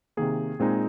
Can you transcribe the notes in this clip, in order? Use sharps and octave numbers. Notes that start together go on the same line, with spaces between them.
C3 D#3 A#3 G#4
A#2 G#3 C4 D#4